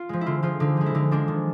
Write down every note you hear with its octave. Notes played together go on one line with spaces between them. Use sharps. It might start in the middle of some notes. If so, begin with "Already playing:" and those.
Already playing: F4
F3 G#3
E4
D3 F4
F3 G#3 F4
D3 D#4
F3 G#3
E4
D3 D#4
F3 G#3 D4
D#3